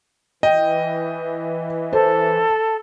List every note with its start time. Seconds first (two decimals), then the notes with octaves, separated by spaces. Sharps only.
0.43 E3 D#5 G5
1.93 A4 C5